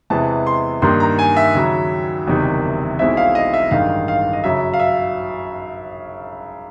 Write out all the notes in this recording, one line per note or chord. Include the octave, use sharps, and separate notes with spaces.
E2 C3 E3 G#3 B3 A5
C6
G2 D#3 G3 A#3 D#4 C6
A#5
G#5
E5
D#2 C#3 F#3
F#1 E2 C3 D#3 G3
B1 B2 G#3 C4 E4 E5
F5
D#5
E5
A1 G2 D#3 G#3 F5
F5
D#5
F#2 C#3 F#3 E5
F5
E5